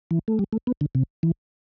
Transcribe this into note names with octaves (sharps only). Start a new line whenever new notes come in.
E3
A3
G3
A3
B3
D3
C3
E3